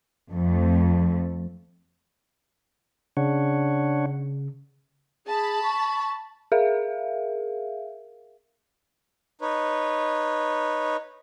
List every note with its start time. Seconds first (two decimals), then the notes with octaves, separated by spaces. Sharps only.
0.29 F2 A3
3.17 C#3 D4 C#5 F#5
5.26 G#4 A5 B5
5.63 C#6
6.52 G#4 A#4 E5 F5
9.41 D#4 B4 C#5